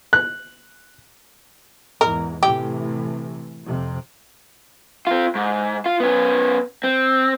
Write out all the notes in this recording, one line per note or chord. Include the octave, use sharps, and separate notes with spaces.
F#6
E2 G#2 A#4
A2 C3 E3 G4
F2 C3
C4 F4
G#2
F4
B3 C#4
C4